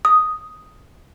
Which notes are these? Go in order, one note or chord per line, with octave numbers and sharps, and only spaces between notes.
D#6